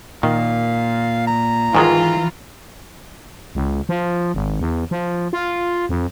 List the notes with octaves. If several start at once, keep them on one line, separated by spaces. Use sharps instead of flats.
A#2 D#3 F5
A#5
G#2 D#3 E3 G#3 F4
C#2
F3
G#1
E2
F3
F4
F2